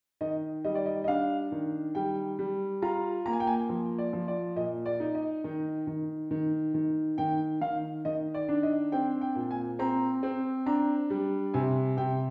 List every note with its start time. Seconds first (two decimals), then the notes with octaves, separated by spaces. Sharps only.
0.21 D#3 D#5
0.65 G3 D#5
0.75 D5
0.86 D#5
1.04 D#5
1.08 D4 F5
1.52 D#3
1.95 G3 G5
2.39 G3
2.82 F4 A#5
3.26 A#3 A#5
3.33 G#5
3.40 G5
3.47 G#5
3.69 F3
3.98 D5
4.13 F3
4.28 D5
4.56 A#2 D#5
4.86 D5
5.00 D#4
5.15 D#5
5.44 D#3
5.87 D#3
6.31 D#3
6.74 D#3
7.18 D#3 G5
7.61 D#3 F5
8.05 D#3 D#5
8.34 D5
8.49 D4
8.63 D#5
8.92 C4 G5
9.21 G5
9.35 A#2
9.51 G#5
9.79 C4 A#5
10.23 C4
10.66 D4 A#5
11.10 G3
11.54 C3 G#5
11.97 C3 G5